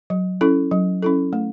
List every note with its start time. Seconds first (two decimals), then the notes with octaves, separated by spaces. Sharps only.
0.10 F#3
0.41 C#4 E4 A4
0.71 F#3
1.02 C#4 E4 A4
1.33 A3